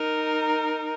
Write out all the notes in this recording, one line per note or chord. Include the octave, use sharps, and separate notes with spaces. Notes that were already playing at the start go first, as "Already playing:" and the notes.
Already playing: D#4 A#4